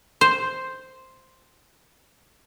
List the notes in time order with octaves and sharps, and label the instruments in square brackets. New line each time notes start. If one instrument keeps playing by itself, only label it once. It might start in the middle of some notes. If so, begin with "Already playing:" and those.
[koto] C5 [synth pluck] C6